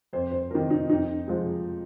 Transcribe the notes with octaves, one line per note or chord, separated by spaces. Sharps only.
F2 C5
C5
C3 D#3 A#4
D#4
F2 D#4
F3 G#3